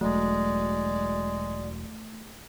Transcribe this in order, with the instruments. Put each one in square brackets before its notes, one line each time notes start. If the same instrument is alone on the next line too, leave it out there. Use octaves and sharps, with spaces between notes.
[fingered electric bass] E1 F#3 [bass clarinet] G#3 [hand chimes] A3 [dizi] D5